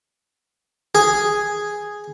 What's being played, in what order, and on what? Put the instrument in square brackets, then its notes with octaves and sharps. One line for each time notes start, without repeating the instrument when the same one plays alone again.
[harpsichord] G#4